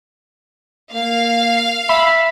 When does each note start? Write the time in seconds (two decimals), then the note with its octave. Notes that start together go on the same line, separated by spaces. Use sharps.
0.93 A#3 F5
1.89 E5 B5